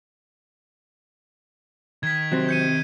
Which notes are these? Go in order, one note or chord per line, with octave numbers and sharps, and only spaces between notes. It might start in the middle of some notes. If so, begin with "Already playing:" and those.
D#3 G#6 B6
C3 F#3 C4
G6 C#7 D#7